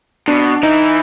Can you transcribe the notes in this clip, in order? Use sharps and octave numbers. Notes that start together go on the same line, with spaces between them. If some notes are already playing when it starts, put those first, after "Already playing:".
B2 D4
E3 D#4